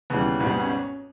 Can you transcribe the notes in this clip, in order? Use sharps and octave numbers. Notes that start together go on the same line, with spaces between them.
D#2 C#3 E3 G3 B3
G#1 G#2 G3 B3
B3
C#4